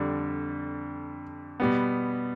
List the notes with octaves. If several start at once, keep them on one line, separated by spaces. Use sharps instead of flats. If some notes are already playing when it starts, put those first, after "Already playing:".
Already playing: F2 D3 G3
B2 G3 B3